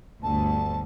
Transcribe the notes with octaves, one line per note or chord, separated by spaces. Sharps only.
G1 D2 A5